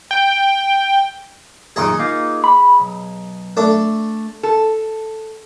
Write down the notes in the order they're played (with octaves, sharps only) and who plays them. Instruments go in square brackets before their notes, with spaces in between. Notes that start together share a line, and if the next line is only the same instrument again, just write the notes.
[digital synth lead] G5
[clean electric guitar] F#2 A#2 D#3 [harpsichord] G#4 D#5
[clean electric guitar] A#3 D#4 F4
B5
B1
[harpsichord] A3 D4 D6
[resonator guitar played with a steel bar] A4